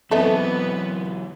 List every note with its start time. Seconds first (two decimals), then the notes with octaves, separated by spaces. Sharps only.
0.11 E3 F#3 A3 B3 C4 A4 D#5 E5